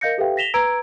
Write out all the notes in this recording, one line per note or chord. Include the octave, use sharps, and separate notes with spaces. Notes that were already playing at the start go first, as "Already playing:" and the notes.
A#4 D#5 F5 G6 A#6 C#7
G4 A4 B4 E5 F5 G5
A#6 B6 E7 F7 G7
B4 A#5 E6 G#6 D7